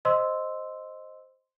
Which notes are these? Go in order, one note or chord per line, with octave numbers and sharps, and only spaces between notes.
C5 D#5 C6 E6